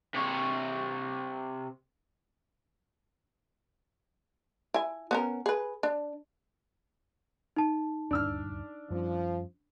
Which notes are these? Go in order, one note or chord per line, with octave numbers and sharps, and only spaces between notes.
C3 C#5
E4 G#5
B3 C#4 A#4
G#4 B4
D4
D#4 A5
D#1 D2 G2 D4 E6 F6
F#2 F3 G3 C#4